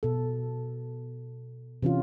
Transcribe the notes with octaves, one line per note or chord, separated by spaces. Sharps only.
B2 A4
C3 E3 C#4 F4